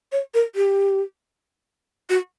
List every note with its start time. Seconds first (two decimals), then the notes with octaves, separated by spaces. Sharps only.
0.12 C#5
0.34 A#4
0.55 G4
2.10 F#4